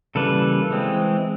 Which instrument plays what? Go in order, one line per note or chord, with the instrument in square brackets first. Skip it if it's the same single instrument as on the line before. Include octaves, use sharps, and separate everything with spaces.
[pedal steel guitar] C#3 E3 G3 A#3 A4 B4
E3 G#3 C4